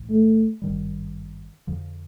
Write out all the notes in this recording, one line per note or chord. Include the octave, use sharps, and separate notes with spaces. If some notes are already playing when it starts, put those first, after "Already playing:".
Already playing: B1 A2 E3
A3
G#1 G2 D#3 G3
F2 D3 F3